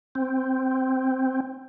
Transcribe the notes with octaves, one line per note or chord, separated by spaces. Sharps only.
C4